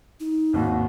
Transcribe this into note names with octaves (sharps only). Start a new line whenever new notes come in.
D#4
G#1 D#2 F#4